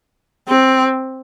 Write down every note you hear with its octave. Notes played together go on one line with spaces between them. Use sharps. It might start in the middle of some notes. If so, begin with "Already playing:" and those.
C4